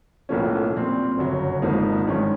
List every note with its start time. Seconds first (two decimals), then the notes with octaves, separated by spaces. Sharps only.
0.29 B1 A2 F3 A#3 C#4
0.73 A#2 G3 C4
1.18 G1 F#2 C#3 F#3
1.62 G#1 G#2 F3 A#3 D#4
2.06 G2 D#3 G#3 C#4